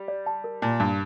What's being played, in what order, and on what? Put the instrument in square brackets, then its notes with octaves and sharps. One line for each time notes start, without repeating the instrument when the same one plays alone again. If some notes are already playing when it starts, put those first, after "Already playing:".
Already playing: [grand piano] G3
[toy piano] D5
A5
A#4
[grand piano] A#2 [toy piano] A5
[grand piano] G2 [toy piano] A5